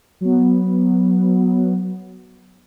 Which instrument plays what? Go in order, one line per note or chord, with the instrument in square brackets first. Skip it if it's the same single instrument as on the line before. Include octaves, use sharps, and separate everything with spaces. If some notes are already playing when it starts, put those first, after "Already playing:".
[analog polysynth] F#3 B3